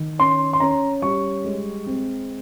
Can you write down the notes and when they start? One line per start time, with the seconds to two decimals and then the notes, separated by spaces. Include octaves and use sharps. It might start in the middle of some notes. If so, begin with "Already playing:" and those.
Already playing: D#3
0.19 C#4 C6
0.53 C6
0.60 C#4 A#5
1.02 G3 C#6
1.44 G#3
1.86 C4